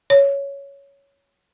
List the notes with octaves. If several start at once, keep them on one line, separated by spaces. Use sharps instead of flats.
C#5